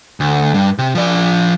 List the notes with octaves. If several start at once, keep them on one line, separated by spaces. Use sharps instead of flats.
D2
G2
C3
F3 D5